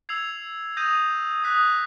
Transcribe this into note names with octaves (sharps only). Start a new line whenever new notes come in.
E6 G#6 C7 F7
D#6 G6 A#6 D#7
D#6 F#6 B6